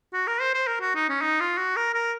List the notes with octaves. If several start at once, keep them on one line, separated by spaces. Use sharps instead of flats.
F#4
A#4
C5
C5
A#4
F#4
D#4
C#4
D#4
F4
F#4
A#4
A#4